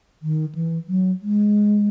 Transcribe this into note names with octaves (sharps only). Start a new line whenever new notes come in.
D#3
E3
F#3
G#3